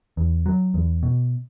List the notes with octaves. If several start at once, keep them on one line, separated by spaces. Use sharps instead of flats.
E2
F#3
E2
B2